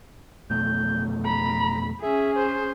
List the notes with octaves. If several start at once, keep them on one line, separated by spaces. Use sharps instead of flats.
F2 B2 A3 G6
A#5 B5
C#4 G#4 E5
C5